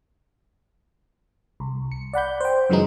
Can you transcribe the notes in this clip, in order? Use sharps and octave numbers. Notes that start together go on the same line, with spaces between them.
C2
C#7
D5 F#5 B5 G6
C5 G5
F#2 C#3 E3 F#3 G#3 D#4